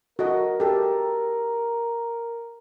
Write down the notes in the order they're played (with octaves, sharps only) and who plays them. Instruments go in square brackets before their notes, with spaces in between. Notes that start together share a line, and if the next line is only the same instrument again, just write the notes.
[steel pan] F#4 A4 D#5 [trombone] A#4
[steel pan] G4 A4